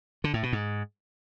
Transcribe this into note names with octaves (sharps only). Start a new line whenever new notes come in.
D3
A2
B2
G#2